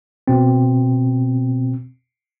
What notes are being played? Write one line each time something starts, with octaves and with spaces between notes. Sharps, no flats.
B2 C4